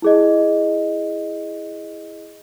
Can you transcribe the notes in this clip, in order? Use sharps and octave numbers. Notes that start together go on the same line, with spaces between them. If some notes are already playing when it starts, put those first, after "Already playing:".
E4 G#4 D#5